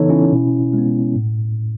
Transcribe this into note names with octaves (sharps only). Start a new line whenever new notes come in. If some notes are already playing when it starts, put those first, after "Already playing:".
Already playing: C#3 E3 B3 D#4 A4 C#5
C#4 E4
B2
G#3 B3
A2